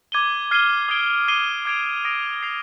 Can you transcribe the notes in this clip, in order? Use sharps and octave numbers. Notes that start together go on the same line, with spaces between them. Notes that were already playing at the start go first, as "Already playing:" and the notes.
D6 G#6 D#7 G7
F6 G#6 C7 D#7 G7
D#6 G#6 D7 G7
D6 F6 C7 D#7 G7
D6 G#6 D7 F7
D#6 A#6 D7
G#6 C7 F7